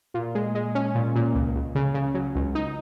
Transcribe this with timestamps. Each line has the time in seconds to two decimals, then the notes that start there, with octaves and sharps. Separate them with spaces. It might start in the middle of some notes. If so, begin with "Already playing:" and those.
0.14 A#2
0.35 G#3
0.55 G#3
0.75 C#4
0.95 A#2
1.15 A#2
1.35 C#2
1.55 C#2
1.75 C#3
1.94 C#3
2.14 F#3
2.35 C#2
2.55 D#4